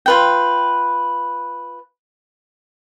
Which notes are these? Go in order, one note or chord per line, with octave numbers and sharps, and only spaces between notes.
F4 B4 G5